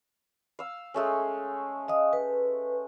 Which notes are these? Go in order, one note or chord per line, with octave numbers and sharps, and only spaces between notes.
F5 E6
G#3 A3 C#4
D#5 F5 D#6
B4